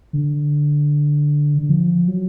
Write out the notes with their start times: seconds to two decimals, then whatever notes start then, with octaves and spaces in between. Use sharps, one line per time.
0.13 D3
1.58 D3
1.70 F3
2.08 F#3